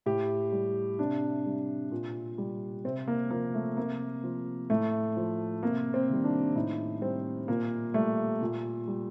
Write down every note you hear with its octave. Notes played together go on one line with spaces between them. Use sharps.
A2 G4
G3
C3 D4
G3
A#2
G3
C3 C4
A#3
F3 A#3
A3
C3 A#3
F3
A2 A3
F3
C3 A#3
C4
D#3 G3
D4
A2 D#4
G3 C4
A#2 A#3
G3 A3
A#2
G3